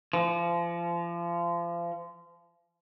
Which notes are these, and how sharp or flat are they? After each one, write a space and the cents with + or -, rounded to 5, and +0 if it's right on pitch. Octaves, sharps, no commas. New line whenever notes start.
F3 -30